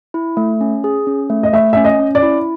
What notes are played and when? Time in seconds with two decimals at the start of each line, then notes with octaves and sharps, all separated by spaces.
0.14 E4
0.37 A3
0.61 C#4
0.84 G#4
1.07 C#4
1.30 A3
1.43 D#5
1.53 A3 E5
1.73 C#4 E5
1.84 D#5
2.00 C#4
2.15 D5
2.23 E4